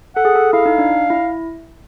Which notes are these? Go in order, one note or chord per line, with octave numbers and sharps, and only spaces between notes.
A4 F#5
G#4
A4
E4 F5
D#4
D4
E4